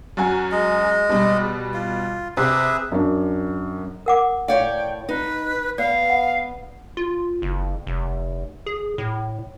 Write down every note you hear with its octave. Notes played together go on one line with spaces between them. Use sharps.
F#2 F#4 G#5
G#3 D#5
B2 G3
F4
C3 G#4 B4 E5
F#2 D4
A#4 F#5 D6
A2 C#5 D5 F5 G5
D#4 B4
B3 D5 F5
F#5
F4
F#1
F1
G#4
A2